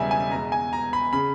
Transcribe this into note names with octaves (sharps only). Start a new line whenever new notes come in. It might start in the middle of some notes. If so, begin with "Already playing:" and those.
Already playing: E1 E2 C#3 G3 E5 G#5
G#5
E2 B2 G#3 A#5
G#5
A#5
B5
C#3 B5